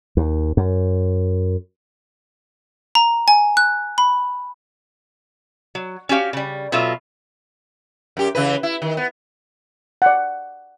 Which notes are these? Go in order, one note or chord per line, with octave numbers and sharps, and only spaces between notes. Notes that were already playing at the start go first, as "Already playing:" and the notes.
D#2
F#2
A#5
G#5
F#6
B5
F#3
C#4 F#4 G4 F5
C#3 G3
B2 F#3 F4 A4 E5
F#2 G4
C#3 E3 B4
E4
D#3
B3
D5 F#5